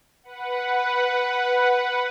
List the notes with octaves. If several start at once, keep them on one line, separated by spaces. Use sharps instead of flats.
B4 F#5